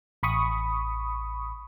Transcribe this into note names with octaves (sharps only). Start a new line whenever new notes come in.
A1 B5 C#6 D#6